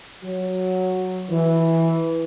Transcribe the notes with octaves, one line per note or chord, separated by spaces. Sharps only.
F#3
E3